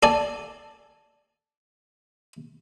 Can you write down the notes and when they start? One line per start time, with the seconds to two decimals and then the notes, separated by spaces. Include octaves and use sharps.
0.03 A4 D5 G#5